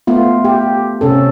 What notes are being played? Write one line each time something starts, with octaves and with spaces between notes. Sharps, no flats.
A3 B3 F4
G4
C3 C#4 A4